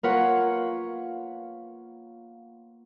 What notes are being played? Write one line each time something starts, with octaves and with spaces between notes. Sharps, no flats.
A#3 F4 A#4 B4 C#5 F#5